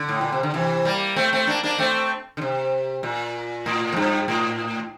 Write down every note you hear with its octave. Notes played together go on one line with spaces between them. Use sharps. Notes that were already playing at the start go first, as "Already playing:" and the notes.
Already playing: D3
A2
A#2
C3
D3
C3 E3
G3 A#3
A3 C4
A3 C4
A#3 D4
A#3 D4
A3 C4
D3
C3
A#2
A2
F2
G2
A2